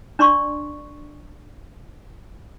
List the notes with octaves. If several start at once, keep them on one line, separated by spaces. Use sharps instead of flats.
D4 D5 C6 C#6